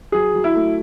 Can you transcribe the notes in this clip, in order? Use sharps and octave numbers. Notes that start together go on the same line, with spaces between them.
F#3 G#4
F#3
E4
A3